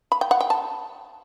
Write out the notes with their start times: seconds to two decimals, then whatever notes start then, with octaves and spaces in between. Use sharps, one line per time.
0.12 B5
0.21 G5
0.31 F#5
0.41 G5
0.50 A5